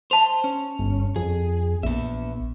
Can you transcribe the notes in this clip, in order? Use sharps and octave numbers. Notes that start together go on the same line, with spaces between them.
C5 A5 F7
C#4
G1
F2 G#4
A#1 B3 E5